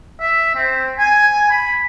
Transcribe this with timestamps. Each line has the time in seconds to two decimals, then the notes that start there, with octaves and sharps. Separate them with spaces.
0.20 E5
0.55 C4
0.99 G#5
1.50 B5